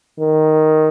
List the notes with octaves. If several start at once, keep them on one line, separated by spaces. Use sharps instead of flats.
D#3